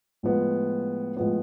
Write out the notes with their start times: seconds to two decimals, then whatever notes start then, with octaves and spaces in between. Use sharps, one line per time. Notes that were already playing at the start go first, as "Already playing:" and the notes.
0.23 A2 F3 G#3 B3
1.17 A2 F3 G#3 B3